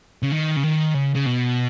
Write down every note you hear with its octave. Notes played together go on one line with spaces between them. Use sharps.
C#3
D#3
C#3
D#3
C#3
C#3
B2